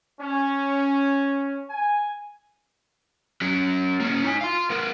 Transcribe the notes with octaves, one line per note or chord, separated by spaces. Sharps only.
C#4
G#5
F#3 C#4
A#3 C#4
D#4 G#5
F5 C6
B3 A#4